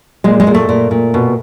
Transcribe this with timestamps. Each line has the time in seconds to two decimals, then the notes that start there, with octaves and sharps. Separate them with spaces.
0.24 A#2 G#3
0.40 G#3
0.47 A#2
0.55 A3
0.69 A#2
0.91 A#2
1.14 B2